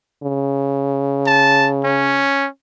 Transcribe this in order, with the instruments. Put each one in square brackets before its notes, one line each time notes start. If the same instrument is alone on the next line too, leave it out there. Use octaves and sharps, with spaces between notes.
[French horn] C#3
[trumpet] A5
C#4